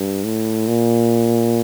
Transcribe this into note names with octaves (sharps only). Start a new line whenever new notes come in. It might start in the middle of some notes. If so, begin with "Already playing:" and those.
Already playing: G2
A2
A#2